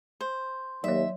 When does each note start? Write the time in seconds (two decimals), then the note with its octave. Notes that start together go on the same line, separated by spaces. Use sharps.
0.21 C5
0.84 D#2 F#3 C#5 E5